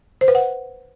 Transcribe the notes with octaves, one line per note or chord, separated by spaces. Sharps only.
C5
B4
F#5